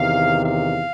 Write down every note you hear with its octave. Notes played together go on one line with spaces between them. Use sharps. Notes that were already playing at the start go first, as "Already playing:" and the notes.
Already playing: E2 C3 D#3 F5
F5